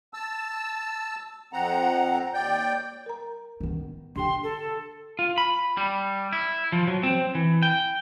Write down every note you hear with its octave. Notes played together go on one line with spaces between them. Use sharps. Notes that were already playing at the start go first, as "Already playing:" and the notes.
A5 E6
F2 F3 C4 F#5 A#5
D#2 D5 G5 G6
A#4 A#5
D#3 B3
D3 D4 G4 G5 C6
A4
F4
B5
G3
E4
F3
F#3
C4
E3
G5